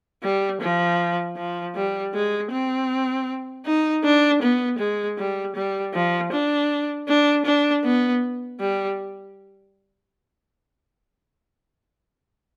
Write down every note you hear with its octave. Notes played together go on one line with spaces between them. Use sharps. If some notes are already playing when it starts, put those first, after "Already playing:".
G3
F3
F3
G3
G#3
C4
D#4
D4
B3
G#3
G3
G3
F3
D4
D4
D4
B3
G3